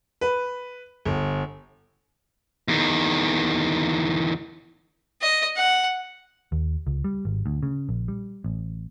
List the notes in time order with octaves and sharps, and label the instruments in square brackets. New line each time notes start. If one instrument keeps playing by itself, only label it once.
[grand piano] B4
G1
[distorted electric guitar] E2 D#3
[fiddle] D#5
F#5
[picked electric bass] D#2
C#2
G3
G#1
D2
C#3
A#1
G3
A1